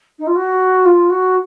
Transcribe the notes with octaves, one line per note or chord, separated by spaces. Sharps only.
D#4
F4
F#4
F4
F#4